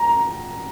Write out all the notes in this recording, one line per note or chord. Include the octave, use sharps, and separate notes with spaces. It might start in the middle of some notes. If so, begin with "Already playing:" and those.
Already playing: A#5